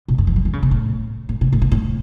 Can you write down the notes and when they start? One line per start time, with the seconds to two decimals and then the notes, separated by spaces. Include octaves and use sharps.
0.08 B2
0.18 F#2
0.27 E3
0.36 F#3
0.45 E3
0.53 C#3
0.63 B2
0.71 A2
1.29 A2
1.41 B2
1.53 A2
1.62 B2
1.72 A2